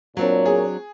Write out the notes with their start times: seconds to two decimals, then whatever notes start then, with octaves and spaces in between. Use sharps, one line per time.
0.17 A#2 F#3 C4 D4 A#4 C#5
0.46 G#4